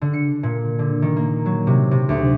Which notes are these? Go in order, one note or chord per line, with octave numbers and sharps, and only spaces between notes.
D3
C#7
A#2
D3
D#3
A#3
F#3
C3
C3
D2